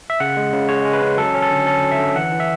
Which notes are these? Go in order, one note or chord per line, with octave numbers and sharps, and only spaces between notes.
E5
C#3 F#5
G#3
C#3
G#3 C#5
G#3
B4
C#4
F#3 A4
C#4
A4
D3
C#4 A4
F#3
E5
D3
E3 F#5
E3
E5